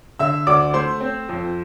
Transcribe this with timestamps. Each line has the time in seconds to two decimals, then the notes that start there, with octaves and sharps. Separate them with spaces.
0.19 D3 E5 E6
0.47 D2 D5 D6
0.73 A3 C5 C6
1.00 C4
1.29 F2